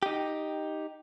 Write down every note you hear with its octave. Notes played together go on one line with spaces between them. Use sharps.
D#4 G4